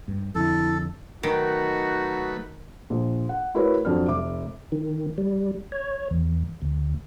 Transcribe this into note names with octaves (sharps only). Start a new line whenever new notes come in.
G2
F2 D3 E4 A4
D#3 F#3 A3 D#4 F#4 B4
A#1
F#5
A3 E4 F#4 A#4 B4 C#5
F2 F#3 D4 F6
F1 E5 D6
D#3
G3
C#5
E2
D2